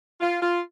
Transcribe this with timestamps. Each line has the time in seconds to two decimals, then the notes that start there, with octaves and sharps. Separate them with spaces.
0.21 F4
0.41 F4